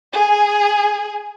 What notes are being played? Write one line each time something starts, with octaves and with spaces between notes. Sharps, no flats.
G#4 G#5